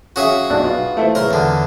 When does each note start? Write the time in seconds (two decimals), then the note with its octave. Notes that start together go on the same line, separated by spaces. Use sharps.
0.16 C#4 F4 F#4 G#4 E5
0.50 B1 D4 F#6
0.64 B3 F4
0.97 A3 E4 C5
1.15 E3 G#3 A#4 C#5 C6
1.31 E2 D3